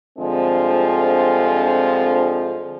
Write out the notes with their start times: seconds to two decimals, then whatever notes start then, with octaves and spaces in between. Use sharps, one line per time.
0.18 G2 D3 F3 G#3 C4